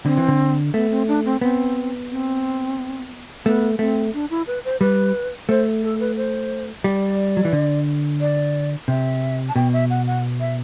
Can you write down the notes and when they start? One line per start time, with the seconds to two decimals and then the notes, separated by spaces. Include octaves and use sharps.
0.06 D3 C4
0.17 E3
0.28 D3
0.74 A3 B3
0.91 C4
1.08 D4
1.25 C4
1.41 B3 C4
2.10 C4
3.45 A3 B3
3.79 A3 C4
4.14 D4
4.30 E4
4.47 B4
4.65 C5
4.81 G3 B4
5.49 A3 C5
5.83 A4
6.00 B4
6.16 C5
6.84 G3 D5
7.37 F#3
7.45 E3
7.52 D3
8.21 D5
8.88 C3 E5
9.49 A5
9.56 B2 G5
9.73 E5
9.90 F#5
10.07 F#5
10.40 E5